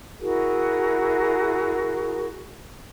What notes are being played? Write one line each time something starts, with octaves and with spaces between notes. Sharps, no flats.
E4 F#4 G#4 A#4